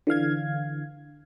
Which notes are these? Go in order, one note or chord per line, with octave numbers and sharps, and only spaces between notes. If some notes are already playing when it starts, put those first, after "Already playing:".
D3 E3 F5 G#6